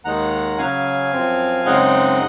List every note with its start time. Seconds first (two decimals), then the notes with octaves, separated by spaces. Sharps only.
0.04 D#2 D#3 G#3 D#4 F#5 A#5
0.58 C#3 F#3 C#4 F5 G#5
1.13 F#2 F3 C4
1.65 F#2 C#3 G#3 C4 D#4 D#5 F#5